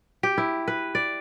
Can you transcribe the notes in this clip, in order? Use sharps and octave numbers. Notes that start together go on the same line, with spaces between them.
G4
E4
B4
D5